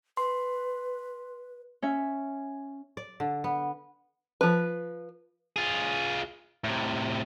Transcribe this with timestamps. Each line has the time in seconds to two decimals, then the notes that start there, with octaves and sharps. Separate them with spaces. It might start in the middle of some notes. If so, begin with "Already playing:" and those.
0.17 B4 C6
1.82 C#4 E5
2.97 D5
3.20 D3
3.44 B3
4.41 F3 B4
5.56 F4 G#4
6.64 A2 C3